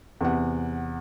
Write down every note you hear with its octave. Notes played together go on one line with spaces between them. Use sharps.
E2 C3 F#5